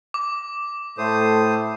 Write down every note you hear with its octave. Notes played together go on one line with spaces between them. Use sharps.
D6
A2 A3 C5 D#6